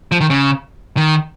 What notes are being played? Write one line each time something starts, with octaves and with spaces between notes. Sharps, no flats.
F3
D#3
C#3
D#3